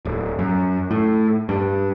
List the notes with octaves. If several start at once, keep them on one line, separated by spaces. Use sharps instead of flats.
D1
F#2
A2
G2